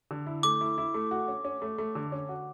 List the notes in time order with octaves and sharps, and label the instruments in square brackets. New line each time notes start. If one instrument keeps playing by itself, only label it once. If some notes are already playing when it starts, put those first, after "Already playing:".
[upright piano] D3
E4
[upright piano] A3 [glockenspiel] D6
[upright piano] E4
E4
A3
F#4
C#4
C#4
A3
A3
D3
C#4
F#4